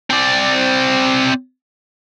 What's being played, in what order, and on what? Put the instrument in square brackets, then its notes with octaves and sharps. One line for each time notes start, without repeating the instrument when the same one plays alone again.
[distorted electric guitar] C4 D5